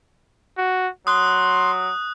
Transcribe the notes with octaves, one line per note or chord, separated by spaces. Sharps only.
F#4
F#3 C6 D#6 F#6